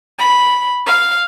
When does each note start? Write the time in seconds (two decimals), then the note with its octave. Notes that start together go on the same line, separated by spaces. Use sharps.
0.19 B5
0.87 F5